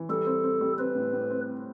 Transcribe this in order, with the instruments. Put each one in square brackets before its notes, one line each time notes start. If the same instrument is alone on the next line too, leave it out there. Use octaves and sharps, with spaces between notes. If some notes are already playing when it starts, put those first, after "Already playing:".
Already playing: [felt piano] E3
[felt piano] G3 [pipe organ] A4
[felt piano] C4
C4
G3
[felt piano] C4 [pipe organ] B4
[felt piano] A2
A2
C4